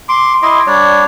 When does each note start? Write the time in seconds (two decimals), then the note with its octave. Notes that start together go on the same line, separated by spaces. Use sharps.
0.09 C6 D6
0.42 E4 D#5 C6 D6
0.66 G3 D4 C#5 D5